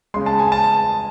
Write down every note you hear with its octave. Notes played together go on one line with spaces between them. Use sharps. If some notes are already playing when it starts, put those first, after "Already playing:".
C#3 G#3 C6
A5
G#5
A5